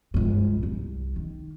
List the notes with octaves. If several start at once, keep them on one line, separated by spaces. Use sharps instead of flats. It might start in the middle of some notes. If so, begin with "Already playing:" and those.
C#2 G2
C2
D#3